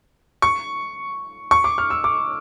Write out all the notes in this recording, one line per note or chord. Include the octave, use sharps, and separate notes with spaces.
C#6
C#6
D6
F6
E6
D6